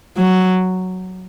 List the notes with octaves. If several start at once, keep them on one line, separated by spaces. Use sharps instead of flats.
F#3